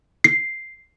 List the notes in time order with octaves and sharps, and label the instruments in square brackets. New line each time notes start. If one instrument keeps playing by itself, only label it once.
[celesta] C7